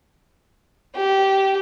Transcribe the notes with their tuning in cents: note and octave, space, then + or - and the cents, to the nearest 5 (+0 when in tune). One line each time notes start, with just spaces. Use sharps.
G4 -15